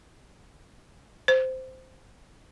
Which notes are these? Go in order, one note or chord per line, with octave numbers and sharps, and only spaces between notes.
C5